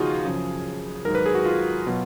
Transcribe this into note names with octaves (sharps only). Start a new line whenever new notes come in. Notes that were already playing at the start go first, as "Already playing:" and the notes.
Already playing: D#2 C#3 F3 D#4 F4 F#4 G#4
F#2 C#3 F3
G#2 D#3 F#3 A#4
B4
G#4
F#4
F4
B2 F#3